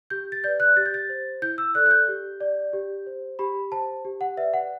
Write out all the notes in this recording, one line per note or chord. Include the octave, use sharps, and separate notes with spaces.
G4 G6
A6
B4 D5 G6
F#6
G4 A6
G6
A6
C5
E4 G6
E6
A4 D5 F#6
F#6
G6
G4
D5
G4
C5
G4 B5
C5 A5
G4
F#5
B4 D5 E5
F#5